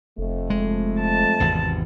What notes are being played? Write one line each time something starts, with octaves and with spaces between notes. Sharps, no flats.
F1 F2 A3
G#3
A5
G#1 E2 C3